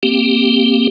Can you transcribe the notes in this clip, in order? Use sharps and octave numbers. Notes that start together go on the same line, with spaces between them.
A#3 C4 G4